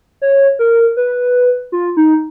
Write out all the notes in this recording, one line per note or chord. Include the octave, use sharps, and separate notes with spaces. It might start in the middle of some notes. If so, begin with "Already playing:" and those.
C#5
A#4
B4
F4
D#4